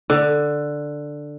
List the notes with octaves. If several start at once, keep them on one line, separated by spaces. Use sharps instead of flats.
D3